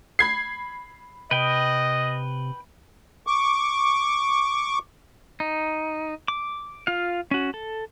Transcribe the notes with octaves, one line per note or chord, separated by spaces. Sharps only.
B5 G#6 C7
C3 B4 D#5 G5
C#6 D6
D#4
D6
F4 F5
C#4 F#4
A4